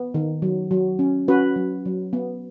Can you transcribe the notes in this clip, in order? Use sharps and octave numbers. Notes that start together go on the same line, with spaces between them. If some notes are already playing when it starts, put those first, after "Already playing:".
Already playing: B3
D#3
F#3
F#3
C#4
C#4 F#4 B4
F#3
F#3
B3